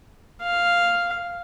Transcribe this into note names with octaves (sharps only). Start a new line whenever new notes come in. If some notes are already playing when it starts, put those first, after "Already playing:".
F5